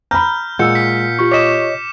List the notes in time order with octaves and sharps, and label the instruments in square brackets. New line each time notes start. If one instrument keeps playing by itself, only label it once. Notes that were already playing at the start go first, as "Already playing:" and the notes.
[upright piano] A#5 B5 [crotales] F6 G6
[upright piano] A#2 [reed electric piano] G#3 [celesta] F#5 E6 [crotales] G6 C#7
[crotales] B6
[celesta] F4 G4 C#6
[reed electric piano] C#5 D#5 [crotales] D6 B6 E7